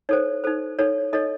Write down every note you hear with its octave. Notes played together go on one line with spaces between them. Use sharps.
D#4 A4 C5 C#5
D#4 A4 C5
D#4 A4 C#5
D#4 A4 C#5 D#5